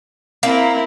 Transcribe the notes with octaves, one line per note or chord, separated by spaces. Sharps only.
A#3 C4 E4 A#4